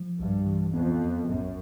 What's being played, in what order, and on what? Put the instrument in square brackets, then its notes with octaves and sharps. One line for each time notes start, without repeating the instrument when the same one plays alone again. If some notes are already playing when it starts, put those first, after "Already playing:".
Already playing: [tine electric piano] F3
[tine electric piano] B1 [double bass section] G2
[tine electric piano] E3
[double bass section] F2 [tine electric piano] B3
[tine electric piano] E2
[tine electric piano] A1 [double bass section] F#2